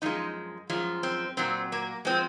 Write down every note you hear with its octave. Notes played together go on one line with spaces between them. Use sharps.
F#2 F3 G#3 D#4
F#2 F3 G#3
C4
A#2 F#3 C4
A#3
F3 G#3 C4